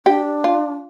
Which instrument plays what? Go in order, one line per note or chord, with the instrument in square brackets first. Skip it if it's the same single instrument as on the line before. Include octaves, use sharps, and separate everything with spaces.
[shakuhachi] D4 [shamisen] G4
[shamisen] F4